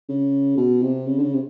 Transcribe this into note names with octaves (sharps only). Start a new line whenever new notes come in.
C#3
B2
C3
C#3
D3
C#3
C3